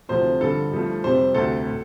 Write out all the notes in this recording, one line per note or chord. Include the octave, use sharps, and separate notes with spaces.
D2 C3 F3 A3 C5
G2 D3 F3 A4
G2 F3 A3
F2 C3 G3 C5
D2 C3 A3 A4
A2